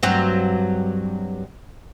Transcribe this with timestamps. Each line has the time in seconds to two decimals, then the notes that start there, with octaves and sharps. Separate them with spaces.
0.03 G2 F#3 C4